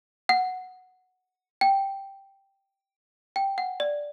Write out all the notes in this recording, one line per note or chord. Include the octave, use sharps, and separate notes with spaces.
F#5
G5
G5
F#5
D5